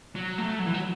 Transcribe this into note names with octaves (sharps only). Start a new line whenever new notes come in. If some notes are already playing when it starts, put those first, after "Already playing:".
F#3
A3
F#3
E3
F#3